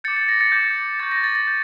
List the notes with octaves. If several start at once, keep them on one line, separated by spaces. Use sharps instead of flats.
D6 G6 A6 C#7
A6
A#6
A6 C#7
D6 G6
C#6 G6 A6
A#6
A6
A6
G6